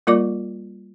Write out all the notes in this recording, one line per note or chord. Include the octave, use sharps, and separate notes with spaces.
G3 A#3 F4 A#4 D5 D6